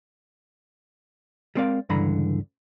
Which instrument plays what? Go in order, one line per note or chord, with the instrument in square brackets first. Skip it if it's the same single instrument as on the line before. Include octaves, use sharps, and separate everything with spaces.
[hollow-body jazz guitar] G3 G#3 C4 A#4 D5 F5
C#2 G2 D3 E3 A#5 B5